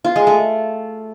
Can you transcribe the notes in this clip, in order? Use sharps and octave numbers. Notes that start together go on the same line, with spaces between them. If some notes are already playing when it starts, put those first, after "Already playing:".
F4
G#3
A3